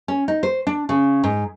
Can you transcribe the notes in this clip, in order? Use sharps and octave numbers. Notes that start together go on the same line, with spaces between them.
C#4
D#4
C5
D4
C#3
G#2